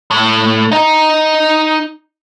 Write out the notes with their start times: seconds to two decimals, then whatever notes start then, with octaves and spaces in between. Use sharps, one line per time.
0.11 A2
0.72 D#4 D#5